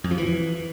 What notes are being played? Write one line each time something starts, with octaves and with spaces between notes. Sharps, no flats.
F2
F3
E3